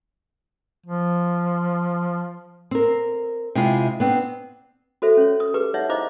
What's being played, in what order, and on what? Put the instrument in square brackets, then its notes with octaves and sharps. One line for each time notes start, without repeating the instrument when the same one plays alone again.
[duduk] F3
[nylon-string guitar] C4 A#4
C3 G#3 E4 F4
B3 C4 D4
[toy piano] F#4 A4 C5 E5
C#4 C#5
D#6
G4 G#4 B4 D6
D#4 C#5 E5 F#5
E4 C5 D#5 F5 D6